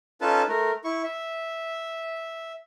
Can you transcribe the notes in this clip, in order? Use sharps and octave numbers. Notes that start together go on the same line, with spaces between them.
C#4 D#4 F4 A4 B4 A5
A3 A#4
E4 C#6
E5